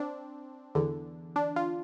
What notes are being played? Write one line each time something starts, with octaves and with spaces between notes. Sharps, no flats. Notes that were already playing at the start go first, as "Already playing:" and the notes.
Already playing: C4 D4
E2 D3
D4
F4